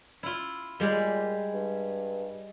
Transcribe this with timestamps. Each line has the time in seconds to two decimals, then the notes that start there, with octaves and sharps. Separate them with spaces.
0.23 E4 F4
0.80 A#2 G3 G#3 G4
1.54 G2